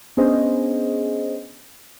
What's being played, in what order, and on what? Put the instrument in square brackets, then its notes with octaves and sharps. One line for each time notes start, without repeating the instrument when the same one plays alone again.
[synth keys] B3 C#4 D4 G#4 C5 D#5